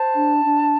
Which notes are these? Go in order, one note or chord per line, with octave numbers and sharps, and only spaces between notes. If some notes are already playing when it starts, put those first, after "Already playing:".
Already playing: C5 A5
D4
D4